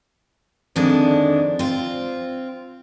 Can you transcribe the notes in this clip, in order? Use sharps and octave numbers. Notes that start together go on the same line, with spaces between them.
F2 D3 D#3 G#3 D4
C4 F4